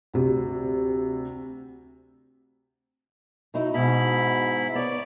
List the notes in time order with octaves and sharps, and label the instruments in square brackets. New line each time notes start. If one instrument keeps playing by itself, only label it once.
[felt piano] D2 C3
[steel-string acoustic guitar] F#3 D#4 E4
[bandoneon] G#2 E4 B5 [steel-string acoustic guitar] B2
[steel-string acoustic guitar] B3 C#5 [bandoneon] D5